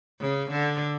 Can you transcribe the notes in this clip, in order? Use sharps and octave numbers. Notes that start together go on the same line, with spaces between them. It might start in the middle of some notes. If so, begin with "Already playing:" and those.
C#3
D3